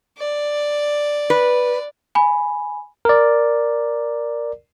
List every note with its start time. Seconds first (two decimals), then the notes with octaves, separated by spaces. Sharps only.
0.18 D5
1.30 B4
2.15 G#5 B5
3.05 A#4 D5